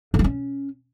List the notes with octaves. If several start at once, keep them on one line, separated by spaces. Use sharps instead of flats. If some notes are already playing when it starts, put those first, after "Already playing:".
D3
G3
C#4